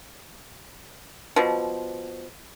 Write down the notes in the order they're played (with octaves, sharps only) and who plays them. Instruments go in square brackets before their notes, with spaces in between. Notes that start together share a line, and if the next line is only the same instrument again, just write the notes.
[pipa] B2 F3